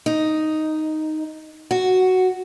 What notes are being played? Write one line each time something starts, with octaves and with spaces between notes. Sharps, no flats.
D#4
F#4